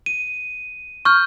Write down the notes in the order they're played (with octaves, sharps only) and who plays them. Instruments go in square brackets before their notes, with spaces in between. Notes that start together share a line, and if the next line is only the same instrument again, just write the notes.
[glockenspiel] D#7
C#6 F6 G6